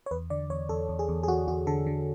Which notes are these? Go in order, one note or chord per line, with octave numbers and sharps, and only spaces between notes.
C#5
E2 B4
D3 D5
E2 C#5
E2 A4
E2
G#4
E2
G#4
E2 F#4
E2 F#4
D3 A4
D3